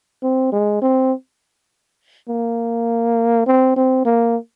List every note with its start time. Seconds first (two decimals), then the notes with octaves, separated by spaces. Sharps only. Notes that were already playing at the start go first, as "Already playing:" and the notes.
0.23 C4
0.52 G#3
0.82 C4
2.29 A#3
3.46 C4
3.76 C4
4.05 A#3